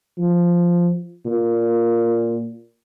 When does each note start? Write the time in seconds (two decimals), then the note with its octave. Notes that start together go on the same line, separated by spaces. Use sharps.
0.18 F3
1.25 A#2